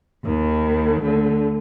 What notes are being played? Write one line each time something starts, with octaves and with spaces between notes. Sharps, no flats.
D#2 D#3
D2 D3